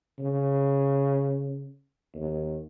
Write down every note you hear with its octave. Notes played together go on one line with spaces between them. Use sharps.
C#3
D#2